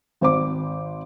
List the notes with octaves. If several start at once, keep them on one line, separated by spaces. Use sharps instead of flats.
G#1 C5 D6